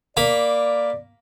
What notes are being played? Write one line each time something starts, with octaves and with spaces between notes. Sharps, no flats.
A#3 D5 B5